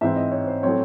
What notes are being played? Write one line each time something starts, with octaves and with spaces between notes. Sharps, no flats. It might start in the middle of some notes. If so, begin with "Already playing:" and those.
G#2 E3 C4 E5
D#5
C#5
C5
A2 F#3 C4 C#5